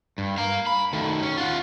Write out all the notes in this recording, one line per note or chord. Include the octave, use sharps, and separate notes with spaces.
G2
F5 A#5
B5
D#3 A3
C#4
F4 F#5